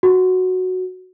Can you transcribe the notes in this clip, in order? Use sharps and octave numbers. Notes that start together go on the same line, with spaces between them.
F#4